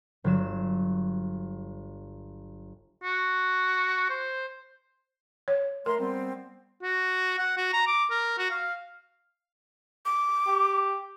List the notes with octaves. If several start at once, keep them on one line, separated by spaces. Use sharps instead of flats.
G1 F#3 E7
F#4
C5
C#5
A3 A#4 A#5 C6
G3 B3 C4
F#4
F#5
F#4
A#5
D6
A#4
F#4
F5
D6
G4